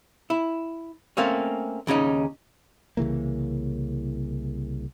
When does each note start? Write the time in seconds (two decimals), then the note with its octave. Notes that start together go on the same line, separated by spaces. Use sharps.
0.30 E4
1.17 A3 A#3 C4 C#4
1.87 D#2 C#3 C#4 D#4
2.97 C2 C#3 E3 A#3